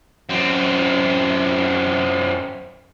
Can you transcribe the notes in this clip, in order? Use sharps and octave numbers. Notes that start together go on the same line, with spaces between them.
F#2 C4